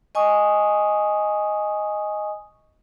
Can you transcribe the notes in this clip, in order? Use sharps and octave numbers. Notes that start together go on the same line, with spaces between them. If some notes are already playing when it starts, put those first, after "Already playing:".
D#5 G#5 C#6 D#6